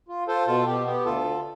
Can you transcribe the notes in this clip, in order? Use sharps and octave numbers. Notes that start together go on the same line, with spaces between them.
F4
F4 A4 C5
B2 F4 A4
B2 G4
B3 G4
D2 F4 A4
D3